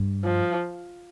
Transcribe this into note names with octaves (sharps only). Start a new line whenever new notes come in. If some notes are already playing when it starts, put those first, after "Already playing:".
Already playing: G2
F3